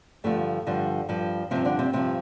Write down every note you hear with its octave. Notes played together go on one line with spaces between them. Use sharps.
G2 D3 F3 A3
G2 D3 F3
G2 F3
G2 C3 F3 C4
D3 D4
C3 C4
G2 C3 F3 C4